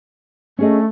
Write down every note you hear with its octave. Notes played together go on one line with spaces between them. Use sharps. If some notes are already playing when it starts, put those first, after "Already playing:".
A3 C#4 G#4 D#5